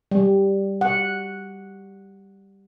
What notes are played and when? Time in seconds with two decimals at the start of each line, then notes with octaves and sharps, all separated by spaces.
0.11 G3
0.81 F#5